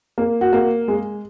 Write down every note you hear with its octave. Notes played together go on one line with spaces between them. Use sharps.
A#3
F#4
A#3
G#3